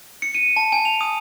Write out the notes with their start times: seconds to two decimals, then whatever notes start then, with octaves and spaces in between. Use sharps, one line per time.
0.22 C#7
0.35 D#7
0.56 A5
0.72 G#5
0.85 F7
1.01 D#6